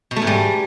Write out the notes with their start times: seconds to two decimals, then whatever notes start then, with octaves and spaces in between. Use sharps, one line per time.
0.11 B2
0.16 A3
0.22 G#2
0.27 G3